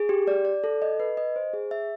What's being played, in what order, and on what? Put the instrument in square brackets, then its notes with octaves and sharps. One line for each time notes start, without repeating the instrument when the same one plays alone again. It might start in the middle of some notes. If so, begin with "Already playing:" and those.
Already playing: [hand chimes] G#4
G4
D5
D5
A4
D#5
B4
D#5
C5
G#4
E5